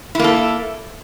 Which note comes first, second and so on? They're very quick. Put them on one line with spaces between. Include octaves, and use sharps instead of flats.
E4 A#3 A4